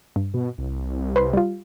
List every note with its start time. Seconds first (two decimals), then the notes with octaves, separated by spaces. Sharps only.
0.16 G2
0.34 B2
0.58 C2
1.16 B4 C5 C6
1.33 G3 F4